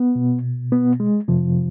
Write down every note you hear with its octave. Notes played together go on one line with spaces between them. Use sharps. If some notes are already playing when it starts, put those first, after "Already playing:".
Already playing: B3
B2
B3
G#3
F2 C3 F3